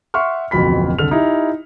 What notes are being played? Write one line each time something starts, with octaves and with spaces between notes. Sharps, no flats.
E5 F#5 C6 C#6 F6
D1 A1 F2 B2 B5 B6
C2 D3 A4 F6 F7
D#4 E4 G4